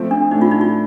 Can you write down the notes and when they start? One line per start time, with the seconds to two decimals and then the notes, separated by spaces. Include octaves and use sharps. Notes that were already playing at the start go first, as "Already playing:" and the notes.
Already playing: F3 A3 C4
0.11 D4
0.31 A2 A3 D4 D#4
0.42 F4
0.51 D#4
0.61 F4